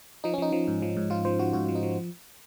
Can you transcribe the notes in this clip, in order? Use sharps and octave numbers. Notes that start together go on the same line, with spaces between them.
F3 D#4
C#4
F3 D#4
F3
G#2
F3
G#2
F3 F4
F3 C5
F3 F#4
G#2 F#4
F3
D#4
F3